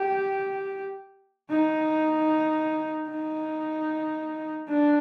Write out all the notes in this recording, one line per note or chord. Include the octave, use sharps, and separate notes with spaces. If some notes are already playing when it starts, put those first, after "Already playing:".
Already playing: G4
D#4
D#4
D4